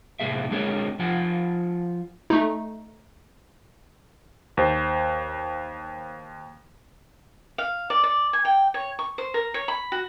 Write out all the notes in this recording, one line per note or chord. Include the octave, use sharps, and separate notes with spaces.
A2 C3 A#3 G#4 E5
D3 G#3 C4 G#4 A#4 C#5
F3 F4 F#5 G#5
A3 D#4
D#2 C5
F5
D5
D5
G#5
G5
C#5
C#6
C5
A#4
C#5
B5
F#4